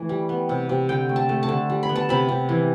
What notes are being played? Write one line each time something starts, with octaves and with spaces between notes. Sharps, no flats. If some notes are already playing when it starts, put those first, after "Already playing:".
Already playing: E3 A3
G3
B3
C3
C3
D3 G5
A3
A5
A3
A5
D3
G3
B5
B3
A5
C3 B5
C3
E3